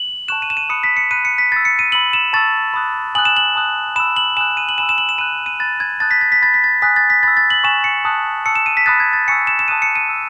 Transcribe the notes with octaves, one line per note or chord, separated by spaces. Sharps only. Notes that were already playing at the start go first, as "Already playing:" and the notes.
Already playing: F#7
A5 C#6 F#6 E7
D#7
E7
D#7
B5 D#6 F#6 C#7
B6
C#7
B5 F#6 D#7
C#7
B6
B5 E6 A6
C#7
D#7
B5 E6 F#7
E7
A5 C#6 E6 A6
B5 D#6 F#6
G#5 D#6 F#6 F#7
E7
F#7
A5 D#6 F#6
B5 E6 E7
F#7
G#5 D#6 F#6 E7
D#7
F#7
G#5 B5 E6 E7
E7
F#7
E7
B5 F#6 D#7
D#7
B5 F#6 A6
G#6
A5 D#6 F#6 A6
B6
A6
B6
B5 F#6 A6
B6
A6
G#5 D#6 F#6 B6
A6
B6
B5 E6 A6
A6
F#7
G#5 C#6 F#6 E7
C#7
A5 D#6 F#6
A5 C#6 E6 C#7
E7
D#7
B6
B5 D#6 F#6 A6
G#6
A6
G#5 C#6 E6 C#7
E7
E7
A5 D#6 F#6 D#7
C#7
D#7
A5 E6